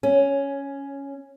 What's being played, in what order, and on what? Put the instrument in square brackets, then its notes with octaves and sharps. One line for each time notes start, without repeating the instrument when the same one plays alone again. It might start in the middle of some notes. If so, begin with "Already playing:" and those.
[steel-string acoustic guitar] C#4